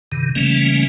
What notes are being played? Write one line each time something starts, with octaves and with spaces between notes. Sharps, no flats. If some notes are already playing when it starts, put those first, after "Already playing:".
G2 C3 D#3
C#3 E3 G3 A3 A#3 C#4